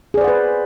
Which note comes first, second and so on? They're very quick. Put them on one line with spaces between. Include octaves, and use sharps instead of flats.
G#4 D5 C5 F#5 B4